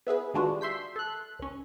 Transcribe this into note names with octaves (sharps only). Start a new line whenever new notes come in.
B3 E4 G#4 B4
D#3 G3 G#3 D4 F4 F#4
E5 C6 G6 B6
A4 F#6
C#2 C#4